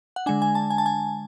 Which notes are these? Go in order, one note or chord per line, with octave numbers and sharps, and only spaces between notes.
F#5
D3 G#3 D4 G#5
G#5
A5
G#5
A5
G#5